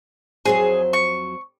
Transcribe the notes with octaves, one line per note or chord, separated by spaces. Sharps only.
F2 F#3 G#4 C5
C#6